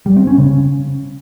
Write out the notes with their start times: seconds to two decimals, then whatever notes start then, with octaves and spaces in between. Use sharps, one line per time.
0.06 G3
0.17 C4
0.27 C#4
0.38 C#3